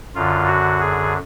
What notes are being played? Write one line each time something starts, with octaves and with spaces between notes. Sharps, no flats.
F#2 D3 F4
F#4
G#4